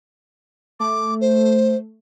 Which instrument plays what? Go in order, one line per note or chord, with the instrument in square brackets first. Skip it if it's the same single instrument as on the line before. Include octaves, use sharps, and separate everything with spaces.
[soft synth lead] A3 [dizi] D6
[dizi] C5